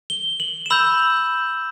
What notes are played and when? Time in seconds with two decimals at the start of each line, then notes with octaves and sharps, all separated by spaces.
0.10 G7
0.40 F#7
0.66 E7
0.70 B5 E6 G6 F#7